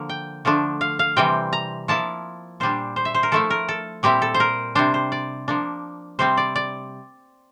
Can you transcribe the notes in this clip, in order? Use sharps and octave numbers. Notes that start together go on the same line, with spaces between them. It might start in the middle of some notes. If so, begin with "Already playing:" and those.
Already playing: D3 F3 A#3
G5
D3 F3 A3 D4
F5
F5
C3 E3 G3 C4 G5
A#5
F3 A#3 E4 A5
A#2 G3 D4 C5
C5
E5
C5
A#4
F3 A3 E4 A4
A#4
A4
A#2 G3 C4 E4 G4
A4
C5
A#4
C3 G3 D4 C5
C5
D5
F3 A#3 D4
C3 G3 C4 C5
D5
D5